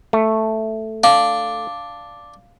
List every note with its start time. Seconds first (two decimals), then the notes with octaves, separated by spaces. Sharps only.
0.13 A3
1.04 D4 F5